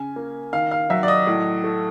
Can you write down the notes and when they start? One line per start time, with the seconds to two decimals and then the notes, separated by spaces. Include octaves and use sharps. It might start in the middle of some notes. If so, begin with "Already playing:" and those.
Already playing: C#3 G#5
0.16 A#3
0.53 D#3 F5
0.71 F5
0.90 F#3 E5
1.03 D5
1.08 D#5
1.27 A2
1.64 A3